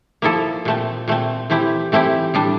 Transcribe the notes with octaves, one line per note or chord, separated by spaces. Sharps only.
F3 A#3 E4 A4
A#2 A3 C4
A#2 A3 C4
E3 A3 C4 E4 G4
E3 A3 C4 E4 G4
A2 G3 D4